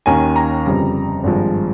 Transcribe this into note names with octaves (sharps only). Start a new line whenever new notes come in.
D#2 D#3 A#3 C#4 G#5
A#5
G1 F2 C#3 G3
G#1 G2 F3 G#3